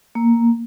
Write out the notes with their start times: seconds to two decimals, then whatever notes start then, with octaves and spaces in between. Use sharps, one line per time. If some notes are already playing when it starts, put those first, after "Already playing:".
0.15 A#3